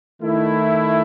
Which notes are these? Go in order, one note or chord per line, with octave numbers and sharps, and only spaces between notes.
D#3 A3 E4